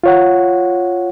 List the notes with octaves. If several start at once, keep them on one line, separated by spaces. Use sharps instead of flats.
F4 C#5 F#5